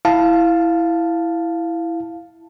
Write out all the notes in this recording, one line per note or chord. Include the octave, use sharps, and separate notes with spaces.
E4 F5 A5